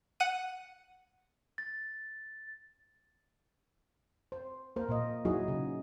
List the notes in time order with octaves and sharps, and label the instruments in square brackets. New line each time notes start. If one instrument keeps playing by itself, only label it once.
[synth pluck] F#5 D#7
[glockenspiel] A6
[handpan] C5
A#3 A#4 C5
A#2 A#3 D#5
F#3 D#4 E4 F#4 G#4 D#5
C#3